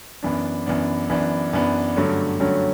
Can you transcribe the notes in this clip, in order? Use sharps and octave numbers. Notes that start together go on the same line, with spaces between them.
F#2 E3 B3 D4
F#2 E3 B3 D4
F#2 E3 B3 D4
F#2 E3 B3 D4
G2 D3 F#3 A3 C#4
G2 D3 F#3 A3 C#4